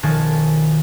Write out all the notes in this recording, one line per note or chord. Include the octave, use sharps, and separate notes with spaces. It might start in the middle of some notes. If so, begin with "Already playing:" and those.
B1 D#3 F3 F#4 G#5 A5